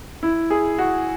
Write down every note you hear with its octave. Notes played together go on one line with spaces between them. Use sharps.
E4
G#4
F#4